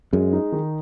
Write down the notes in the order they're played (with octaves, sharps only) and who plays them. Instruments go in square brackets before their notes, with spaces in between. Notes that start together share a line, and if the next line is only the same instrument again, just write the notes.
[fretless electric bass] F#2 [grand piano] G#3
[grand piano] D#4
D#3